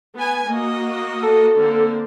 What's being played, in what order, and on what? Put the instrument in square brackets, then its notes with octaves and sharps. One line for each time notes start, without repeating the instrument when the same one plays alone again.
[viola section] B3 B4 G#5
A#3 F#4 D#5
[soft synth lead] A4
[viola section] D3 A#3 C4